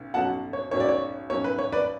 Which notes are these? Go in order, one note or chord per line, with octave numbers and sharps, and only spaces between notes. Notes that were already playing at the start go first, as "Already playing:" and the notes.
Already playing: B1 C#4
B1 B2 F#3 C#4 F#5 A5
C#5
B1 B2 F#3 C#4 C#5
D5
C#5
B1 B2 F#3 C#4 C#5
B4
C#5
B4 D5